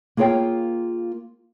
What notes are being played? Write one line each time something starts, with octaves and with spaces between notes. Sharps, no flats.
A#3 F4 G#4 C#5 G5